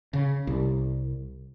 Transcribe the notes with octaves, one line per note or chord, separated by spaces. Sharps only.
C#3
C2